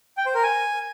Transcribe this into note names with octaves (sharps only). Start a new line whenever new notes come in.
G5
C5
A#4
G#5